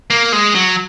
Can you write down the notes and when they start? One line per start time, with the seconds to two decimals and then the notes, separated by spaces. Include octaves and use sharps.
0.10 A#3
0.32 G#3
0.55 F#3